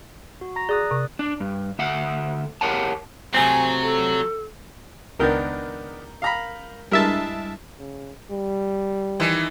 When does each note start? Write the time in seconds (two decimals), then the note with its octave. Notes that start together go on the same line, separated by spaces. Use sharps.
0.41 F#4
0.56 A#5 A#6
0.69 G#4 D5 D#6 F#6
0.91 C3
1.19 D4
1.40 G2
1.79 D2 E5 F#5
2.61 G4 A#4 C#5 F#5 A5
3.34 C3 F#3 A3 C4 G#5
3.82 A4
5.19 C#2 D#3 B3 D4 A#4 G6
6.22 F5 A#5 B5
6.91 G2 G#3 E4 A#4 E5 A5
7.79 C#3
8.32 G3
9.20 D#3 E3